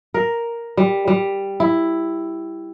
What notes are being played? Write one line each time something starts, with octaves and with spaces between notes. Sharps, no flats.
A#4
G3
G3
E4